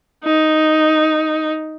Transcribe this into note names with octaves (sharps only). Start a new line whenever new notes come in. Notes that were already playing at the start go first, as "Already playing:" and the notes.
D#4